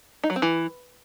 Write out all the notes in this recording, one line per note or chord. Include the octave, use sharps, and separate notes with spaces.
D#4
F#3
C4
E3